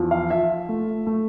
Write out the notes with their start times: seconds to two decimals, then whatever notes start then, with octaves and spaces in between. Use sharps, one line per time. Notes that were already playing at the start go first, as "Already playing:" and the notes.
Already playing: E2 F3
0.11 F5
0.30 F4 E5
0.69 A3
1.07 A3